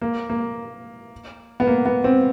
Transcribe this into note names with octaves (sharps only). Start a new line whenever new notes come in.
A#3
A#3
B3
A#3
B3
C4